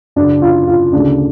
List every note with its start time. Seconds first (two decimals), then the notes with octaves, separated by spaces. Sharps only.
0.16 F#2 C#3 D4
0.42 F4
0.67 F4
0.93 D2 C#3 D4